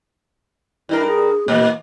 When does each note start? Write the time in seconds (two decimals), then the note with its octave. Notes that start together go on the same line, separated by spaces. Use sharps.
0.89 G2 D4 E4 A#4
1.06 G#4
1.48 A#2 E3 A#3